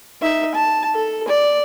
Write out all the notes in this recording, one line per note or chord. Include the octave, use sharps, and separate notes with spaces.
D#4 E5
A5
A4
D5